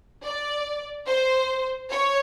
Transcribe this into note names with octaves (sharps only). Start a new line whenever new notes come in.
D5
C5
C#5